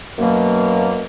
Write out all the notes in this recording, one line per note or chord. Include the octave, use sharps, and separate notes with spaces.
F#2 B2 F#3 A#3